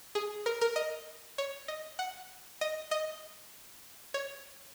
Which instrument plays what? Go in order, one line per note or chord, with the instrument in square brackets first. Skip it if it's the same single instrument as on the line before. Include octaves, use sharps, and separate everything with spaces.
[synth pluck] G#4
A#4
A#4
D#5
C#5
D#5
F#5
D#5
D#5
C#5